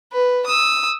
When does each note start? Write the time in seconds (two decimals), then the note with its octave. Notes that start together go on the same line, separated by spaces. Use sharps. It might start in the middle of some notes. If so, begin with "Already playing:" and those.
0.13 B4
0.46 D#6 E6